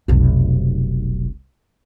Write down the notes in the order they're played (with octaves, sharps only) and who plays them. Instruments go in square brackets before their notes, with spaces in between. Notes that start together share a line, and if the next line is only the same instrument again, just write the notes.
[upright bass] F1 B1